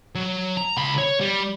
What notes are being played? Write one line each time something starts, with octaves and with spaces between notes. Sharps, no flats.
F#3
A#5
C#2 B5
C#5
G3